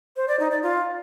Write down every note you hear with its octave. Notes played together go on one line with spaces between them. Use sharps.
C5
D5
D#4
D5
F4